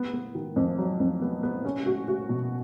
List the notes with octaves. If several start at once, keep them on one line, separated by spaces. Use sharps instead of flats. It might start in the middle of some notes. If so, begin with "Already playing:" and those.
Already playing: B3
B3
D#3
F2
F#3
F2
B3
B3
C#4
F#4
F#4
B2